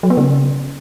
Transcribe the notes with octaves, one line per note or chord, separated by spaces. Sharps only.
F#3
B3
C#3